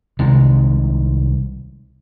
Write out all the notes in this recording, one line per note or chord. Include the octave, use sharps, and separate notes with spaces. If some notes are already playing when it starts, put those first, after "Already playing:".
C2 C3 D#3 G#3